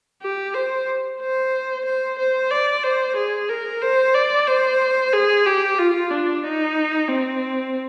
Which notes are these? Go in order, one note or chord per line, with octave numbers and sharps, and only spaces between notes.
G4
C5
C5
C5
C5
D5
C5
G#4
A#4
C5
D5
C5
G#4
G4
F4
D4
D#4
C4